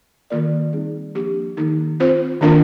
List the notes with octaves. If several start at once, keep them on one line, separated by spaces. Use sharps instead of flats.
D#3 A#3 F4 A#4 D5
G3 C4 D#4 G#4
F3 A#3 D4 G4
D#3 A#3 D#4
C4 F4 C5
D#3 A#3 D4 F4 A#4